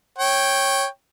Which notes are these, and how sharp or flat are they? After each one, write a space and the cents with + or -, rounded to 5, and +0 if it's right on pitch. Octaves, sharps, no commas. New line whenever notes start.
C#5 -10 G5 +0